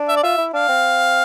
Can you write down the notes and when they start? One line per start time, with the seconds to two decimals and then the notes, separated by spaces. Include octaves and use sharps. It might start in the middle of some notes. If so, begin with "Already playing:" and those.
Already playing: D4
0.08 E5
0.16 D5
0.23 F4 E5
0.38 E4
0.53 D4 F5
0.69 C4